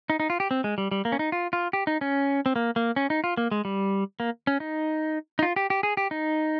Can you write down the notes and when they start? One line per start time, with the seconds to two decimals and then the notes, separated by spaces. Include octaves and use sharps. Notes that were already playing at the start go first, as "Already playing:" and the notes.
0.10 D#4
0.20 D#4
0.30 F4
0.40 G4
0.51 C4
0.64 G#3
0.78 G3
0.91 G3
1.05 A#3
1.12 C#4
1.19 D#4
1.32 F4
1.53 F4
1.73 G4
1.87 D#4
2.01 C#4
2.46 C4
2.56 A#3
2.76 A#3
2.96 C#4
3.10 D#4
3.24 F4
3.37 A#3
3.51 G#3
3.65 G3
4.20 A#3
4.47 C#4
4.60 D#4
5.39 D#4
5.43 F4
5.56 G4
5.70 G4
5.83 G#4
5.97 G4
6.11 D#4